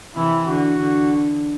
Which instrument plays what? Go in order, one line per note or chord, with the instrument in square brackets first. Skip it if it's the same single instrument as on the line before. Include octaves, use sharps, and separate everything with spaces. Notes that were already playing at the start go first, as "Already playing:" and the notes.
[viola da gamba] C3 E3 [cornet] E4
[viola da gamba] D3 [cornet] F#4
[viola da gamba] D3